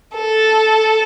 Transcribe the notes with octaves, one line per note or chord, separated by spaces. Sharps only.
A4